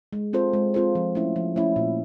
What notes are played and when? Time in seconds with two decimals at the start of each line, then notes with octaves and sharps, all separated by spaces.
0.13 G#3
0.33 C4 F4 A4 C5
0.53 G#3
0.74 C4 F4 A4 C5
0.95 F3
1.15 A3 C#4 E4
1.36 F3
1.56 A3 C#4 E4
1.76 A#2